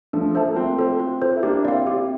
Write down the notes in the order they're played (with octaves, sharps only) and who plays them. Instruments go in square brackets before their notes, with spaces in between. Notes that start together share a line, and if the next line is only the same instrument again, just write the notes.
[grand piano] F3 A3 [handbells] D4
[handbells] A4 C5 E5 A5
[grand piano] A#3
[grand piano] A3 C4 [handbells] F4
[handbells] A4 C5
F4
A4 C5
[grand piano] E4
[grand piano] A#3 D4 [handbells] G4
[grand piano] C4 E4 [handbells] D5 F5
[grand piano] C4 E4 [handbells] G4